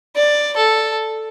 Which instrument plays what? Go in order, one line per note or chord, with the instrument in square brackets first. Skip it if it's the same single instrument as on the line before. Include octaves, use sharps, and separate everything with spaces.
[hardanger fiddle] D5
A4